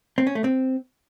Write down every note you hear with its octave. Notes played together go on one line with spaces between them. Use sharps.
C4
C#4
A3
C4